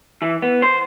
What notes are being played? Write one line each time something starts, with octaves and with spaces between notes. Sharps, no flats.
E3
B3
C5